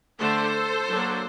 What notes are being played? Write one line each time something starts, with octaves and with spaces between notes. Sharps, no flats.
D3 A3 D4 A4 C5
F#3 A#3 D4